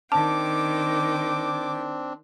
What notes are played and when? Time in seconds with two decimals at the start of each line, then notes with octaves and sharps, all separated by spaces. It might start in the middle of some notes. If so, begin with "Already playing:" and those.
0.12 D#3 C4 D4 G5 A5 D6